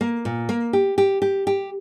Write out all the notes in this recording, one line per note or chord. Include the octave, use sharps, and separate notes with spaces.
A#3
A#2
A#3
G4
G4
G4
G4